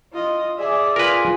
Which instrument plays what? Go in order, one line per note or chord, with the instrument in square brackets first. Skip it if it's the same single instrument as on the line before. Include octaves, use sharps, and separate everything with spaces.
[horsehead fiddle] F4 D#5
[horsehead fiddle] G#4 E5 [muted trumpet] D5
[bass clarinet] F4 [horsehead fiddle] G#4 G#5 [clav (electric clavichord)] A#4 B4